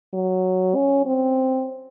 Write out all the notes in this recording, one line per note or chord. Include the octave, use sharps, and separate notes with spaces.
F#3
C#4
C4